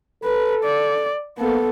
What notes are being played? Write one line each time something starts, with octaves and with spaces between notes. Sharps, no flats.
A4 B4
D5
A#3 B3 A4